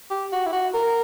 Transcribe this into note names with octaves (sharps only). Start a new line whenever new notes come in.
G4
F#4
E4
F#4
A#4